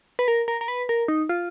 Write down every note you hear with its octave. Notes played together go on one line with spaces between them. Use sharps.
B4
A#4
A#4
A#4
B4
A#4
D#4
F4